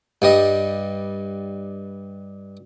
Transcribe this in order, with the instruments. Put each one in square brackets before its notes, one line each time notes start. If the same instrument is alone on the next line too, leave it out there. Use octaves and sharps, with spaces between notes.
[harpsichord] G2 G3 D#5